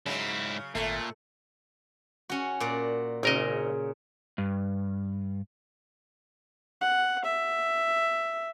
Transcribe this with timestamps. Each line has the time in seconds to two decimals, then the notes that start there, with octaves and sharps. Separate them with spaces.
0.06 G#2 C#3 F#3 E4
0.75 G#1 A#2 A3
2.30 C#4 F#4
2.60 A#2 F#4 D5
3.23 G#1 A#2 C#3 A#4 D#5
4.38 G2
6.81 F#5
7.24 E5